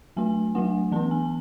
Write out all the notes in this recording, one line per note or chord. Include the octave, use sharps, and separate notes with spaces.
F#3 A3 D4 G#5
F#3 A3 D4 F#5
E3 B3 D4 A5
G#5